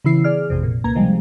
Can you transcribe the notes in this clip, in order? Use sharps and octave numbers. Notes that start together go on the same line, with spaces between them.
C#3 E3 B3 E4 C7
G#4 D5 F6
A1 F2 C3
A#2
C#2 B2 A#3 A#5 G#6
C3 D#3 F3 G3 G#3